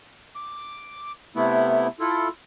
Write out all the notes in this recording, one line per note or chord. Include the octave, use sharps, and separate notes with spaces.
D6
C3 A3 B3 E4
E4 F4 A4